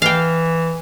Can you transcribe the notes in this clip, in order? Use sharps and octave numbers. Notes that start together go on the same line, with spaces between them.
E3 F5 G5